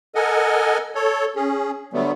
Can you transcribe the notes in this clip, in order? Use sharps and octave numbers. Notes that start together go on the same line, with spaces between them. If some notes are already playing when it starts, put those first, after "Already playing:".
A4 A#4 D#5 F#5 G#5
A4 C#5
C#4 G#4
D3 F#3 G3 A3 B3